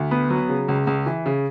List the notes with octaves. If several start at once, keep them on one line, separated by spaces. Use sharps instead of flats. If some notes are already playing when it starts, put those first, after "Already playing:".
Already playing: D2
B3
F#3
C#3
C#2
C#2
E3
C#3